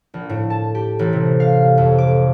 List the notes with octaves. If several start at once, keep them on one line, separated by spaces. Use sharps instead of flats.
A#1
A2
A5
G4
A1
C3
F5
F2
D6